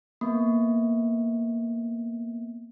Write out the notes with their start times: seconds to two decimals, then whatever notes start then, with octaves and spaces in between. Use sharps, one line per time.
0.21 A#3 B3